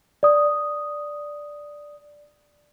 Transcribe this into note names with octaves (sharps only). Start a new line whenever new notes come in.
D5 D#6